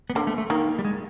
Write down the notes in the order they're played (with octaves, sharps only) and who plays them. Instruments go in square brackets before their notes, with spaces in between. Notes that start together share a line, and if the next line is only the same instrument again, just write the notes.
[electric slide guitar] B3
[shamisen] D3 [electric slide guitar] A#3
[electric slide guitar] A3
A3
[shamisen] D#3 [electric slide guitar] A#3
[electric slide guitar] G3
G#3